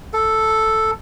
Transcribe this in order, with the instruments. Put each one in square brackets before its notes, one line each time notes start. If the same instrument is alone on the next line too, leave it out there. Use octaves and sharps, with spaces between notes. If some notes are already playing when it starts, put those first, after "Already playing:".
[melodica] A4